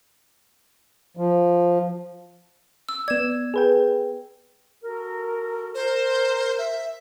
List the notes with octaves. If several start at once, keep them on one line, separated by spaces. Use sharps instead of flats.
F3
E6
B3 D5 G#6 E7
G#4 B4 G5
F#4 A4 A#4
A#4 C5
E5